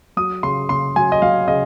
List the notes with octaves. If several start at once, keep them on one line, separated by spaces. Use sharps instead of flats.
F#3 D#6
C#3 C6
C#3 C6
F#3 G#5
D#5
F#3 F5
C#3 D#5